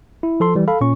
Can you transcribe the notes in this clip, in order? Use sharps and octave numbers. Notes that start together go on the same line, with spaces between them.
E4
F3 A4 C6
E3 G3
A4 F5 B5
A#2 C#4 C#6